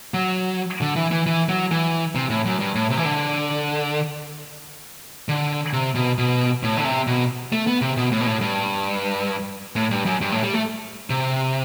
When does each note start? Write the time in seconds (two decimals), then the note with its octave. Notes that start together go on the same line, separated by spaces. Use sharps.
0.14 F#3
0.81 D3
0.96 E3
1.12 E3
1.26 E3
1.49 F#3
1.72 E3
2.15 C3
2.30 A2
2.45 F#2
2.60 G2
2.75 A2
2.90 C3
2.97 E3
3.05 D3
5.29 D3
5.73 C3
5.95 B2
6.18 B2
6.63 A2
6.77 D3
6.85 C3
7.07 B2
7.52 A3
7.67 B3
7.81 C3
7.97 B2
8.12 A2
8.21 B2
8.26 A2
8.41 G2
9.76 A2
9.91 G2
10.06 F#2
10.21 G2
10.32 A2
10.43 G3
10.54 A3
11.10 C3